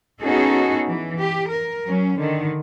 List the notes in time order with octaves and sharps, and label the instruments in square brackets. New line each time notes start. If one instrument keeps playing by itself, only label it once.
[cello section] B3 C#4 D#4 F#4 G#4 A4
E3
G4
A#4
F#3 C#4
D3 D#3